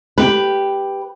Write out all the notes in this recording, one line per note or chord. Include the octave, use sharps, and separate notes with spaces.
G4 B4